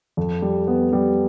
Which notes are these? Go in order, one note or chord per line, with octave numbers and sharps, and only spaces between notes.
F2
G3
B3
G3